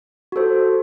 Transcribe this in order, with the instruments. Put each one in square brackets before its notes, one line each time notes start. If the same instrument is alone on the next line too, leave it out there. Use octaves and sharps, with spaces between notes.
[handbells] F#4 A4 C5